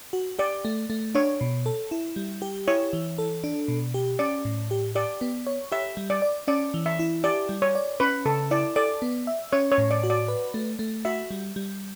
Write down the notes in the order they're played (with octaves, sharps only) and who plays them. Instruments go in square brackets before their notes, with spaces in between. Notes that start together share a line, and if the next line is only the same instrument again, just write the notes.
[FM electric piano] F#4
[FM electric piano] G4 [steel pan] D5
[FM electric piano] A3
A3
[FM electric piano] D4 [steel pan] C#5
[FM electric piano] B2
A4
E4
G3
G4
[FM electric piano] E4 [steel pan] C#5
[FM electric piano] E3
A4
D4
B2
G4
[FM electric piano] C#4 [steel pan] D5
[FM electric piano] A2
G4
[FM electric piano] G4 [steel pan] D5
[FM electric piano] B3
C#5
[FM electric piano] G4 [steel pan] E5
[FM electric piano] G3
[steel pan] D5
[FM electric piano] D5
[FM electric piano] C#4 [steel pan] D5
[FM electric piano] E3
[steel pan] E5
[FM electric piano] E4
[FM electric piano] G4 [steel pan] D5
[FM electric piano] G3
[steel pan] C#5
[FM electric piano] D5
[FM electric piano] C#4 [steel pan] B4
[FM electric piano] C#3 [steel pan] A4
[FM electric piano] E4 [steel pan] D5
[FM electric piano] A4 [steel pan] D5
[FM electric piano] B3
E5
[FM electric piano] C#4 [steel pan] C#5
[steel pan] C#5
[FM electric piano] A2
[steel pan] D5
[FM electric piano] F#4
[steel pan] D5
[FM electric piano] B4
A3
A3
[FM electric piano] F#4 [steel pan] E5
[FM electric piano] G3
G3